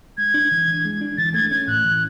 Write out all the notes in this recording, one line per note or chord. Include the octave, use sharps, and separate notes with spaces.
G#3 G#6
D4
E3
E3
G#3
D4
E3 A6
A3 G#6
C#4 G#6
A2 F#6
E3